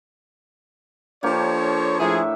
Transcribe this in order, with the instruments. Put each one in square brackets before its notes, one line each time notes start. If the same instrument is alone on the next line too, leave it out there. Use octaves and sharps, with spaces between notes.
[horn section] F3 A4 C#5 [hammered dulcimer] A#3 D4 G4
[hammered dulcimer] A2 E5 C#6 [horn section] F3 G#4